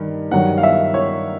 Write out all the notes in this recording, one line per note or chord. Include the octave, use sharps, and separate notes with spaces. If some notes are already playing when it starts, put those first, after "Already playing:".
Already playing: G2 D#3
G2 D#3 F#3 F#5
F5
E5
C#5